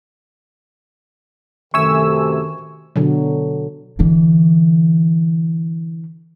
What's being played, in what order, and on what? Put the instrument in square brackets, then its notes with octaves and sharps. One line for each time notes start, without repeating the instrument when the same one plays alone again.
[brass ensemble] F#2 C3 A3 [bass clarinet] D#3 [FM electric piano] E5 G#5 E6 [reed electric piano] C#6
[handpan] B2 D3 F#3
[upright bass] D3 E3